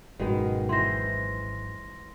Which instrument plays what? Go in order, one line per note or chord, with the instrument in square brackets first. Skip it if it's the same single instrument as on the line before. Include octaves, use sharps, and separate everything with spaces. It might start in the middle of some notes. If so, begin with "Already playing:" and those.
[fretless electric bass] G#1 F#2 [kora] B2 D#3 G#3
[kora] E3 C5 [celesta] C6 A#6